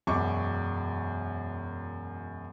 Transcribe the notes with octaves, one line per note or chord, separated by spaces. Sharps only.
E1 F#2 C#6 D6